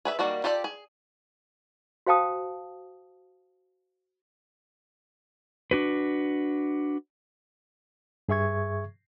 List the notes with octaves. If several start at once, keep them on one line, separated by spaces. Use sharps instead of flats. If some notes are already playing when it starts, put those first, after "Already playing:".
G#4 B4 E5
D#3 G3 A#3 F#4 D5
F4 G4 A4 D5 G5
G#4
F#4 C5 F5 G5 A5 D#6
D4 F#4 B4
G2 G#4 E5 C#6 G#6